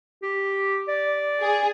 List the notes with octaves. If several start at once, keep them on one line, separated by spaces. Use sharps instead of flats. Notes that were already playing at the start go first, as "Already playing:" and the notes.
G4
D5
G#4